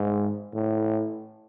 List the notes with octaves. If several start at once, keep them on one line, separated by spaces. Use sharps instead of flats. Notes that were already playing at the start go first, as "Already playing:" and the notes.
Already playing: G#2
A2